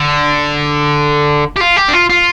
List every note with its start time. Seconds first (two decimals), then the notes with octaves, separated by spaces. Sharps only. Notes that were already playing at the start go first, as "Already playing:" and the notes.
Already playing: D3
1.57 G4
1.61 F4
1.77 G4
1.89 D4
1.93 F4
2.10 F4